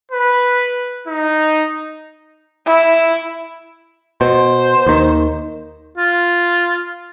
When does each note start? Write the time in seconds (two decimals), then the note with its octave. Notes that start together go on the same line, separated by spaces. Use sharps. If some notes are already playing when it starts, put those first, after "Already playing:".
0.12 B4
1.08 D#4
2.66 E4
4.21 B2 C5
4.86 D#2 D#3
5.98 F4